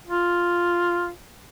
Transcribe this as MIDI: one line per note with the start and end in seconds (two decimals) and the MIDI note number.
0.07 1.11 65